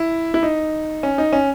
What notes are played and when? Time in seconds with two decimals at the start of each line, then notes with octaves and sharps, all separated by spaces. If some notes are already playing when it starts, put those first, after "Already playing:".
Already playing: E4
0.34 E4
0.43 D#4
1.03 C#4
1.18 D#4
1.33 C#4